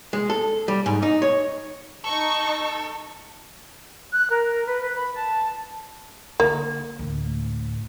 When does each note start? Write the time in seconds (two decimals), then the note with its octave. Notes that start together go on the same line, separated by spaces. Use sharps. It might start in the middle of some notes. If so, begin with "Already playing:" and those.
0.13 G#3
0.30 A4
0.68 G3
0.86 G#2
1.02 D#4
1.22 C#5
2.04 D#4 A4 C#6
4.12 F#6
4.29 A#4
4.67 B4
4.83 B4
4.97 B5
5.13 A5
6.40 D3 A#3
6.99 D2 A2